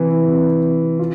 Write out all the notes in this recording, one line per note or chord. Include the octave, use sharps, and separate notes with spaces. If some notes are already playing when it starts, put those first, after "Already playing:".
Already playing: C3 E3
C3
C3
F4